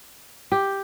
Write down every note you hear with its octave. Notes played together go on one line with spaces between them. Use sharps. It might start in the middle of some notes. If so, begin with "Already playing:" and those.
G4